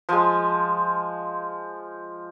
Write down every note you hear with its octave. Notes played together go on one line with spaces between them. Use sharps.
F3 G#3